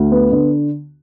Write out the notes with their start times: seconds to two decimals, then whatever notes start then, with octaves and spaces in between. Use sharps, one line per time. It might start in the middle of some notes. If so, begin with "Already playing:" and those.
Already playing: D2
0.12 B3
0.32 D3